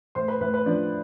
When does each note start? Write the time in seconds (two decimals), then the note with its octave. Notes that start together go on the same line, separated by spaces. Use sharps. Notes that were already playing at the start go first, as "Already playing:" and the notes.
0.15 A2 C5 C6
0.28 B4 B5
0.41 A2 B4 B5
0.54 B4 B5
0.66 F3 D4 D5